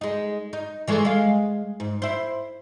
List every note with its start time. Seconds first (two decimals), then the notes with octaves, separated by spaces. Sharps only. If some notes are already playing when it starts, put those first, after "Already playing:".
0.01 G#3 D#4
0.53 D#4
0.88 E3 G#3 A3
1.05 G#3 F5
1.80 G#2
2.02 E4 C5